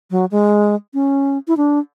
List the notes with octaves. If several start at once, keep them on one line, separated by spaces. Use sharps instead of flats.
F#3
G#3
C#4
E4
D4